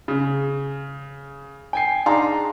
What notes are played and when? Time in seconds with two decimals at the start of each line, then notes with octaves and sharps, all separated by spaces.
0.08 C#3
1.73 G5 G#5 C7
2.06 D4 D#4 G#4 F5 A#5 C6